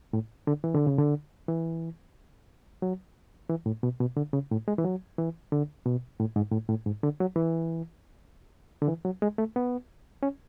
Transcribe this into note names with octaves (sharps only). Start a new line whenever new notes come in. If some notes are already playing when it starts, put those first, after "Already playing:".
A2
D3
E3
D3
C#3
D3
E3
F#3
E3
A2
B2
B2
D3
C#3
A2
G#3
E3
F#3
E3
D3
B2
A2
G#2
A2
A2
G#2
D3
F#3
E3
D3
E3
F#3
G#3
A3
B3
C#4